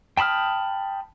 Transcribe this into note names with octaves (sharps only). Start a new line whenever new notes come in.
G5 A5 B5 D#6 F6